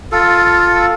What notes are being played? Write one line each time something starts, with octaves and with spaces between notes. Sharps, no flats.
F4 A4